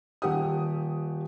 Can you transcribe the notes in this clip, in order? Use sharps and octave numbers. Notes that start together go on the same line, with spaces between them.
D#1 G4 F#5 D#6